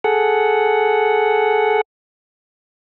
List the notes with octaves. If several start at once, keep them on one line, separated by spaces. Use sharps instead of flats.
G#4 A4 F#5